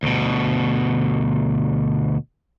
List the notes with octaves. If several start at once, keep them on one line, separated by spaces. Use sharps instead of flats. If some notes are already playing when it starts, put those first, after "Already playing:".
D2 B2